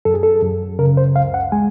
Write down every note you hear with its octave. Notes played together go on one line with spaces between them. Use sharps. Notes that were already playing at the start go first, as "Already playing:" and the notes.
F#2 A4
G#4
A4
F#2
C#3 A#4
C5
C#2 F5
F#5
G#3 G#5